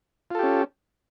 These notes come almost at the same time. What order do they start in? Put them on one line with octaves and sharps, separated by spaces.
F4 A4 G4 C#4